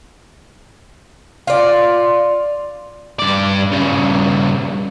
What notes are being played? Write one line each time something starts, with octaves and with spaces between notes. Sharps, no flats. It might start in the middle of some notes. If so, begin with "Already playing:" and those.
F4 D5
G2 D5
G2 C#3